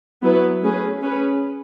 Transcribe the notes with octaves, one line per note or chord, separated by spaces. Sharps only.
F#3 B3 E4 B4
A3 C#4 G#4 B4
C#4 G#4 B4